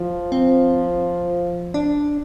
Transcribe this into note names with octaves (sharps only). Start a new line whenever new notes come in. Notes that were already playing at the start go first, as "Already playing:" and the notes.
Already playing: F3
C4
D4